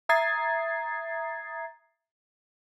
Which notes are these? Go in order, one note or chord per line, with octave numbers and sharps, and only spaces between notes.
E5 A#5 D#6 G#6 A6 C7